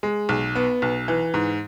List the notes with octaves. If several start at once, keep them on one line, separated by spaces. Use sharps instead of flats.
G#3
B1
B3
B1
E3
G#2